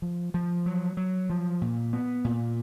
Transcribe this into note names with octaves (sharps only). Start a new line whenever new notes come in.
F3
F3
F#3
F#3
F3
A#2
B3
A#2